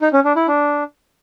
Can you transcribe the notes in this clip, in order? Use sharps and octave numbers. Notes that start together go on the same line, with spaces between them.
D#4
C#4
D4
E4
D4